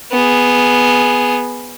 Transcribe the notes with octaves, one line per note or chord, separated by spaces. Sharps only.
B3 G#4